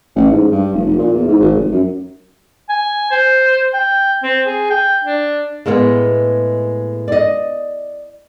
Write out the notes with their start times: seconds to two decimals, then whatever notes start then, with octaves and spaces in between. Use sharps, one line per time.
0.16 A1
0.31 G#2
0.52 G2
0.73 F1
0.87 F1
0.99 A#2
1.14 E2
1.28 G#2
1.41 G#1
1.55 F1
1.72 F#2
2.69 G#5
3.11 C5
3.74 G5
4.23 C4
4.47 G#4
4.70 G5
5.05 D4
5.66 A2 G#3 A#3 B3
7.08 D5 D#5